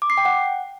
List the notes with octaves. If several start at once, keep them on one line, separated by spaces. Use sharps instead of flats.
D6
C7
G5
F#5